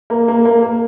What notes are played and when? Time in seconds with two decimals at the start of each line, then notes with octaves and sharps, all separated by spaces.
0.10 A#3
0.28 A#3
0.45 A#3
0.63 A#3